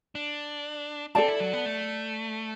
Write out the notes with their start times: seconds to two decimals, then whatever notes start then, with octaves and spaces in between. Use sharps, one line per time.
0.15 D4
1.15 C4 A4 D5 A5
1.28 E4
1.40 F#3
1.53 B3
1.66 A3